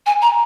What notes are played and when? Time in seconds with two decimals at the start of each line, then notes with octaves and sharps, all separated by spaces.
0.06 G#5
0.22 A#5